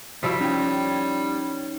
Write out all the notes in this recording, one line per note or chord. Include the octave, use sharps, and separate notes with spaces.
C3 F3 G3 E4 F#4 F5 B6
C#4 D#4 C#5 G5